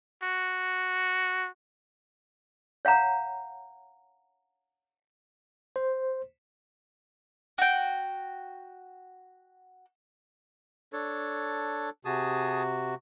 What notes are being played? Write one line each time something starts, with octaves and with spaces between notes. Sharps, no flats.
F#4
C#5 F5 F#5 A#5
C5
F#4 G5
D4 A4 C#5
C3 F#4 G#4 A5 D#6